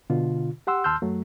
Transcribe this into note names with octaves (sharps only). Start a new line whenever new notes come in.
B2 D3 F4
G4 F#5 C6 E6
D#2 A5 C6 E6 F6 G6
F#2 F#3 A3